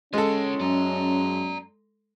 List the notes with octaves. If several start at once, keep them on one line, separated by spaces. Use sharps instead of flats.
G#3 C#4 F4 A4 C#5
F#2 D5 A#5